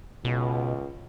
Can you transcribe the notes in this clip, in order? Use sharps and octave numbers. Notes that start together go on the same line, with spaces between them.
C#2 B2